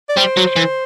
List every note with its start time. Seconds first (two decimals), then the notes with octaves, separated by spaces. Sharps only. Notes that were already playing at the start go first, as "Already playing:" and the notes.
0.09 D5
0.17 G3 C5
0.37 F#3
0.56 E3